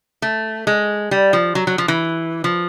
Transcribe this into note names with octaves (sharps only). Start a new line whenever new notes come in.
A3
G#3
G3
F3
F#3
F#3
F3
E3
F3